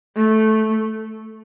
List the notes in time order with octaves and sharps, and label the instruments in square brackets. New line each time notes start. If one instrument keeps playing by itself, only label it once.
[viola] A3